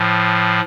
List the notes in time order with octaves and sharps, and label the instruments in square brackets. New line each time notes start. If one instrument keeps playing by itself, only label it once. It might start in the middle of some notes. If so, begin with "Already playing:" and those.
Already playing: [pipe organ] A2 F3